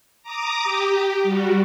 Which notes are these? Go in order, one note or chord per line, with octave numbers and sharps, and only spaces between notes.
A#5 D6 D#6
G4
G3 F#4